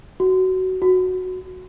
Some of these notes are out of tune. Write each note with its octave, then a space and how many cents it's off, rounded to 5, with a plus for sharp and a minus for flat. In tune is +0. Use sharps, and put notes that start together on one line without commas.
F#4 +15
F#4 -5